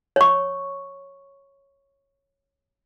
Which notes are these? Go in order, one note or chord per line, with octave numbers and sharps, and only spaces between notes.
C#5 C#6